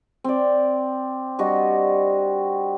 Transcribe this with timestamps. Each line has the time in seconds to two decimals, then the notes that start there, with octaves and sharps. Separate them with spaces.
0.24 C4 D5
1.39 G3 D4 F#4 D#5